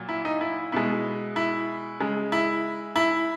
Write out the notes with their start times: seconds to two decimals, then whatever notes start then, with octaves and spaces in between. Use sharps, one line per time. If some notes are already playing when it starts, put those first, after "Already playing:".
Already playing: A#2 F#3
0.09 E4
0.25 D#4
0.41 E4
0.72 B2 G#3 E4
1.36 E4
2.00 C#3 G#3
2.32 E4
2.96 E4